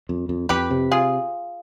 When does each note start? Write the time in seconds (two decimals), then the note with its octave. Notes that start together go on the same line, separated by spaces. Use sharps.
0.09 F2
0.29 F2
0.49 F2 G4 B4
0.71 C3
0.91 F4 G#4